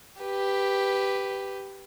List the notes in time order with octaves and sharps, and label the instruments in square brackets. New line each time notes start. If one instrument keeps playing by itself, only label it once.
[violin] G4 B4